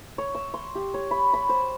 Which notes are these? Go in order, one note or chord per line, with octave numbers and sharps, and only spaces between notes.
C#5
E6
C6
G4
C#5
B5
B5
C5